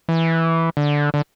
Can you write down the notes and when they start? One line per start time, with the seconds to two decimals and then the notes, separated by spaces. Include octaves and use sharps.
0.09 E3
0.77 D3
1.14 D3